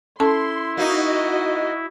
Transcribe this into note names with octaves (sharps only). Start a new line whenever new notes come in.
C#4 E4 A4 A5 C6
A#3 D#4 F#4 D#5